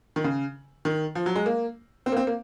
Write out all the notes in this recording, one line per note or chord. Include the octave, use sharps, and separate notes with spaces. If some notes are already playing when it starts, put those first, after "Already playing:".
D#3
C#3
D#3
F3
F#3
G#3
A#3
C4
A#3
C4
A#3